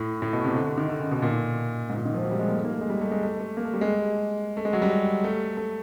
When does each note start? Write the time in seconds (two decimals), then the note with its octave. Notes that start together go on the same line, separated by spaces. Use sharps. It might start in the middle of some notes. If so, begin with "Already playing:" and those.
Already playing: A2
0.22 A2
0.33 B2
0.44 C3
0.56 D3
0.67 D3
0.78 D#3
0.89 D3
1.00 C#3
1.11 B2
1.22 A#2
1.89 G#2
1.97 A#2
2.05 D#3
2.14 F3
2.23 F#3
2.31 G3
2.39 G#3
2.48 A#3
2.56 A3
2.65 A#3
2.73 A3
2.81 G#3
2.90 G3
3.01 A3
3.11 G#3
3.23 A3
3.40 A3
3.57 A#3
3.65 A3
3.74 G3
3.81 G#3
4.57 A3
4.65 G#3
4.73 F#3
4.82 G3
5.24 A3
5.57 A3